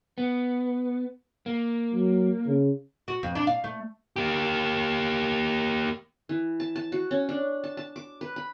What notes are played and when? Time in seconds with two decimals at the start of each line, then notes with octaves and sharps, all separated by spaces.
0.18 B3
1.46 A#3
1.94 F#3
2.46 C#3
3.08 F#4
3.23 F2
3.35 D4
3.47 F5
3.64 A3
4.16 A#3 G4
6.29 E3
6.60 A5
6.76 A5
6.92 F#4
7.11 C#4
7.29 D4
7.64 A5
7.77 A5
7.96 D6
8.21 B4
8.36 B5